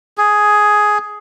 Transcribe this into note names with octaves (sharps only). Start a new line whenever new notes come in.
G#4